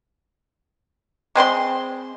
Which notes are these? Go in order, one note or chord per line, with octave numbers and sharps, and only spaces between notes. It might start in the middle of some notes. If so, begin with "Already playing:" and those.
G#3 C4 C5 C6